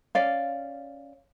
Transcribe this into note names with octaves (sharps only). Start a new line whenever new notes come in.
C#4 D5 F5